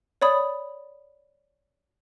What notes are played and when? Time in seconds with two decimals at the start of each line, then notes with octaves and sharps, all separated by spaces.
0.22 C#5 D5 B5 D#6